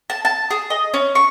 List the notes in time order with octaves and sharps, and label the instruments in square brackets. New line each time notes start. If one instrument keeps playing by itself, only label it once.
[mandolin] A5
A5
G#4
D#5
C#4
C#6